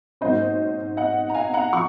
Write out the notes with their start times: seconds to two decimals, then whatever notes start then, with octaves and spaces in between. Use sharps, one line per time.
0.21 G#2 F#3 A#3 C#4 C5 D#5
0.97 D#5 F#5
1.29 A#5
1.35 F5 G#5
1.54 F#5 A#5
1.73 F3 C#6